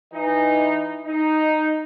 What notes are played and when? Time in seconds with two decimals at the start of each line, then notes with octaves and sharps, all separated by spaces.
0.14 E3 D#4
1.05 D#4